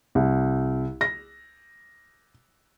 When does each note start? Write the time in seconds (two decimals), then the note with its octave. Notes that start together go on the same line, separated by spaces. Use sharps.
0.15 C2
1.01 A#6